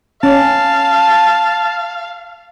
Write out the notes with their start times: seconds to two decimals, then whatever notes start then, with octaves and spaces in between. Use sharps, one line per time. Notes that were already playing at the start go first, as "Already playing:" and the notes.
0.23 C#4 F5 A5